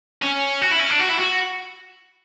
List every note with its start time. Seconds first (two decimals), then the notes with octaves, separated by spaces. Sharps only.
0.22 C#4
0.62 F#4
0.71 E4
0.80 C#4
0.91 D4
1.00 F#4
1.10 E4
1.19 F#4